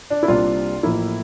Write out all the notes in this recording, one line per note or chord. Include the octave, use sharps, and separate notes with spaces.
D4
E4
C2 C3 G3 A#3 D4 F4
A1 A2 F3 A#3 E4